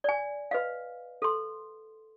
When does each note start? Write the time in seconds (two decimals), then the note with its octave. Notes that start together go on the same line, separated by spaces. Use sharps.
0.04 D5 G#5
0.51 B4 D#5 F5
1.22 A4 C6